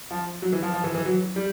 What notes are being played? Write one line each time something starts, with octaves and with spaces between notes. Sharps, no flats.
F3
F#3
E3
F3
F3
E3
E3
F#3
G3